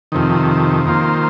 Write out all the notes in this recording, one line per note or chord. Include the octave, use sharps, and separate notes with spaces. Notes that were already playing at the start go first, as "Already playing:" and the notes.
F2 C3 D#3
D#3 A#3 F4 C5